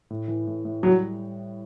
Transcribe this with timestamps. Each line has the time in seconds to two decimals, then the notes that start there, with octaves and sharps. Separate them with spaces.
0.10 A2
0.28 E3
0.47 A2
0.65 A2
0.83 F#3 G3